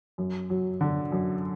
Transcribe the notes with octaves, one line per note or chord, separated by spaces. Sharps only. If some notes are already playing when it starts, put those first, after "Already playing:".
F#2
F#3
D3
F#2